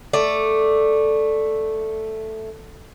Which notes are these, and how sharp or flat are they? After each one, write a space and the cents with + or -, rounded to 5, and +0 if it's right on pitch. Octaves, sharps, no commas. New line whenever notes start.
A3 +0 D5 +0